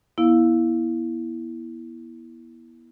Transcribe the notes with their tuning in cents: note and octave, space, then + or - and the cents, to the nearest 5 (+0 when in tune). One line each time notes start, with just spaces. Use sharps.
B3 -35 E4 -5 F5 +10